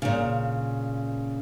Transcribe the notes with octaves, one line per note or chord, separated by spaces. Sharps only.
A#2 C#3